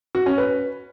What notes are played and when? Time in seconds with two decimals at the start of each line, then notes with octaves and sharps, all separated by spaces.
0.15 F#4
0.26 C#4
0.38 B4